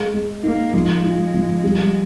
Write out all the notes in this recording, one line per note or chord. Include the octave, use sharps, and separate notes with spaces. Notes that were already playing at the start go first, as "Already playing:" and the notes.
Already playing: G#3
G#3
A#3 D#4
F3 G#3
F4
F3
G3